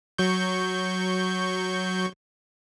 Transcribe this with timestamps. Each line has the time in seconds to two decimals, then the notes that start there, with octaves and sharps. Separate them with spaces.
0.18 F#3 C#6 G6